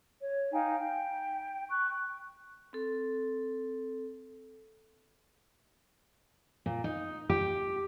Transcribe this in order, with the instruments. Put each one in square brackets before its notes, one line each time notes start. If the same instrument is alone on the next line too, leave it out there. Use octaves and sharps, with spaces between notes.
[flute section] C#5
D#4 F5 G5 G#5
G5
C#6 F#6
[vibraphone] C4 A4
[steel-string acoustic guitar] A#2
D#4
G4